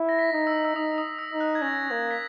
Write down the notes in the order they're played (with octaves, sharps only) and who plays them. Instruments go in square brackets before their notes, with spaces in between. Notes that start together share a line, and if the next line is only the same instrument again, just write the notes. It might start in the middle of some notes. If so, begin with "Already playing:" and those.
Already playing: [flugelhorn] E4
[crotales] A#6
B6
[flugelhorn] D#4
[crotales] E6
E6
[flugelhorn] D#4 [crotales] D#6
[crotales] D#6
E6
[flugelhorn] D#4
[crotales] F#6
G#6
[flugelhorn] C#4 [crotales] A#6
[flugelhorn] A#3 [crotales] G#6
[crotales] B6